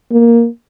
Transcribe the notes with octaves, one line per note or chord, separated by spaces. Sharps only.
A#3